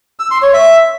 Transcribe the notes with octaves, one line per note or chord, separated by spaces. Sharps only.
E6
C6
C#5
E5